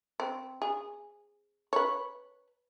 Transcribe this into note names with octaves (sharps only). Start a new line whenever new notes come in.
C4
G#4
B4 C#5